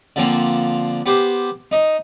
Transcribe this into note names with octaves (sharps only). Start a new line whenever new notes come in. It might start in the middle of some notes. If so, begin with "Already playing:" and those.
D3 F3 A#3 C4
B3 G4 C5
D#4 D#5